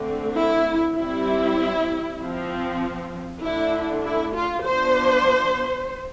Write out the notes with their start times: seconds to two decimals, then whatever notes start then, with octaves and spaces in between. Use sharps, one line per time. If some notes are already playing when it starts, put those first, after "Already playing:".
Already playing: D3 A3 C4
0.38 E4
0.98 G3 C4 E4
2.21 F3 C4
3.43 D3 A3 D4 E4
4.04 E4
4.34 F4
4.64 F3 B3 D4 C5